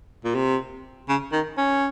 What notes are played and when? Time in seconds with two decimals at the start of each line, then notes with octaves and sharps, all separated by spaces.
0.24 A#2
0.35 C3
1.09 C#3
1.32 D#3
1.58 C#4